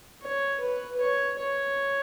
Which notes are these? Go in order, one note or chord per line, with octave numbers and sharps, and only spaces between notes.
C#5
B4
C#5
C#5